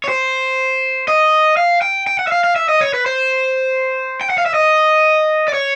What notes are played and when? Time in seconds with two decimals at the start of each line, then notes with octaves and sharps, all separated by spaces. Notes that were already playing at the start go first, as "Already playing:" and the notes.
0.04 C#5
0.09 C5
1.08 D#5
1.57 F5
1.82 G5
2.07 G5
2.19 F#5
2.27 E5
2.32 F5
2.44 F5
2.56 E5
2.69 D#5
2.81 C#5
2.94 B4
3.06 C5
4.21 G5
4.30 F#5
4.38 F5
4.46 E5
4.54 D#5
5.48 D5
5.54 C#5